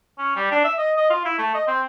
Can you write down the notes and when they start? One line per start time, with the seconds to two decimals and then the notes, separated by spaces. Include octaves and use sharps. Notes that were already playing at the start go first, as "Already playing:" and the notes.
0.19 C#4
0.36 G3
0.51 D4
0.64 E5
0.78 D#5
0.97 D#5
1.10 F4
1.25 E4
1.38 A3
1.54 D#5
1.67 C4